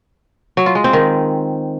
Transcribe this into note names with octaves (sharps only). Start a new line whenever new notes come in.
F#3
F4
G#3
C4
D#3